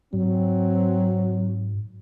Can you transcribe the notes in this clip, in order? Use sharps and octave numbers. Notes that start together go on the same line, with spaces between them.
G#2 F#3 C4